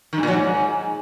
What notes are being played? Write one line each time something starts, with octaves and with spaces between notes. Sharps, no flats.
D#3
G2
A#2
F#3
G#2